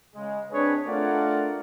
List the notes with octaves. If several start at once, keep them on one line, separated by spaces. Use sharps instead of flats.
C#3 G#3
C4 D4 G#4 B4 C#5
A3 D4 F4 A#4 D5 F#5